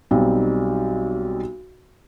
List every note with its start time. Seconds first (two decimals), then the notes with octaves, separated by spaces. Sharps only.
0.11 B1 G3 C4 D#4